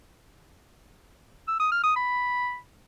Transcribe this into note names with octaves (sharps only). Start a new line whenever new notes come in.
E6
D#6
F6
D#6
B5